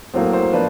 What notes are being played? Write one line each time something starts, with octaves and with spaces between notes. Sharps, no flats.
A2 F#3 A#3 C5
C5
F3 A#3 D4 B4